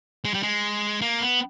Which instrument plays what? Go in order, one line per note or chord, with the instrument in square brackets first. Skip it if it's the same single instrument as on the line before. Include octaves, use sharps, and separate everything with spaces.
[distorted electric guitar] G#3
G3
G#3
A#3
B3